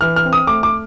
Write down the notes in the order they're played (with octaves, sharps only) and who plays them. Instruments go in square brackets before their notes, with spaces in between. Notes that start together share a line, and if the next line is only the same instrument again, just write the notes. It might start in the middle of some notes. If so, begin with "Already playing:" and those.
[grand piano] E3 F6
F6
C4
D#6
A3 D6
D6